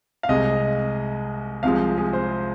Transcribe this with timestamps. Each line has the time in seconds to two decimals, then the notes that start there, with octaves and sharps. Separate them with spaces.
0.23 F5
0.28 C2 C3 G#3 D#5
1.63 C2 C3 F3 G#3 F5
1.98 G#4
2.13 C5